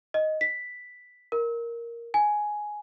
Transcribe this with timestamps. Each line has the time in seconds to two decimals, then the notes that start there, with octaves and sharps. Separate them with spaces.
0.14 D#5
0.41 B6
1.32 A#4
2.14 G#5